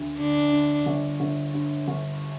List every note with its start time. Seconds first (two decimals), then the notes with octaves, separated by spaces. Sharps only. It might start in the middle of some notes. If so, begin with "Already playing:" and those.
Already playing: D2 D3
0.18 D3 D4
0.52 D3
0.86 G1
1.20 G1
1.54 G2
1.88 G1